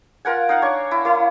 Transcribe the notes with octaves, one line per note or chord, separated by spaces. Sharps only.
F4 A#4 F#5 G#5
D#4 F5 F#5
D4 C#5 C#6
E4
A#3 E4